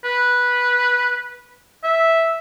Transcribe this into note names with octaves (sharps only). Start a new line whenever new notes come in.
B4
E5